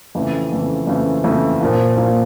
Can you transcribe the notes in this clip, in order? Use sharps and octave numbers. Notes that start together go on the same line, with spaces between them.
F2 C#3 E3 A3
F2 C#3 E3 A3
F2 C#3 E3 A3
F2 C#3 E3 A3
A#2 F3 A#3
A#2 F3 A#3